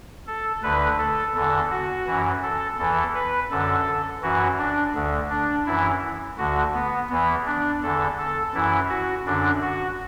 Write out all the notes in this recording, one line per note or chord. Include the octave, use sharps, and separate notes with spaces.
A4
D2 D3 B4
A4
E2 D3 A4
F#4
F#2 E3
A4
E2 E3 A4
B4
F#2 D3 A4
F#2 E3 F#4
D4
D2 D3
D4
F#2 E3 E4
D2 D3 F#4
B3
E2 E3 B3
D4
E2 D3 A4
A4
F#2 E3 E4
F#4
F#2 D3 D4
F#4